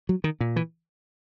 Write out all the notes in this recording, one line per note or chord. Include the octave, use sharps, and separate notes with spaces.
F#3
D#3
A#2
E3